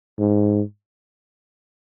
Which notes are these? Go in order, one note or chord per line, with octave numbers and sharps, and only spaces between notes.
G#2